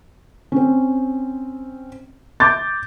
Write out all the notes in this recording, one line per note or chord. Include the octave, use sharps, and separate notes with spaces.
C4 C#4
D6 G6 A6